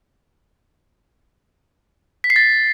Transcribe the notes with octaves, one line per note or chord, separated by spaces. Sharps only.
B6
C7
A6